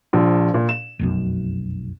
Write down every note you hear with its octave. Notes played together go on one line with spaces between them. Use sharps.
A#1 F3
A#2
E7
F1 B1 F#2